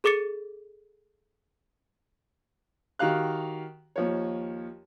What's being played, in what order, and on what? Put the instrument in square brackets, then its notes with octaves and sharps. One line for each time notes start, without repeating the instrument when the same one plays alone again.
[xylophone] G#4 A4 D6 A6 C#7
[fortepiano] D#3 F#4 G4 F5 F#6
D#2 F3 C#5